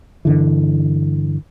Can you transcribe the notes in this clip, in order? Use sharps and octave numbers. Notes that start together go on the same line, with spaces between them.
G2 D3 E3